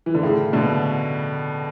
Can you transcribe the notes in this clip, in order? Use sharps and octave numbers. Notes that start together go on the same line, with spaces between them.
E3
D3
A2 C#3
B2 D3